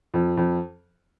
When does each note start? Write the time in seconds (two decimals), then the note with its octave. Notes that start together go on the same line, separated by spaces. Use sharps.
0.14 F2
0.37 F2